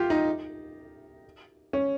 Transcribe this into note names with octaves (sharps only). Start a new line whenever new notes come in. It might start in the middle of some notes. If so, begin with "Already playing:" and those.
Already playing: F4 G4
D#4
C#4